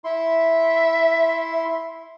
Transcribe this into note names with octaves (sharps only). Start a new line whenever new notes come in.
E4 E5 C6